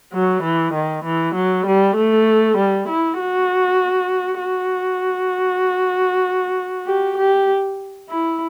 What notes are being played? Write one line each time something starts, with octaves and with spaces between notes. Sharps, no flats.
F#3
E3
D#3
E3
F#3
G3
A3
G3
E4
F#4
F#4
G4
G4
E4